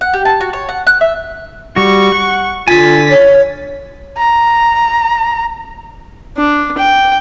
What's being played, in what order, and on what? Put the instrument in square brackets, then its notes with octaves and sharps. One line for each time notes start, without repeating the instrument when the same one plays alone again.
[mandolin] F#5
G4
A5
F#4
C#5
F#5
F#6
E5
[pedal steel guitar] G3 F#4 [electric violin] C#6
[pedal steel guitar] F#5
[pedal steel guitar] D3 G#5 [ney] F4 [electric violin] A6 B6
[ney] C#5
[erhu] A#5
[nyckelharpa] D4
G5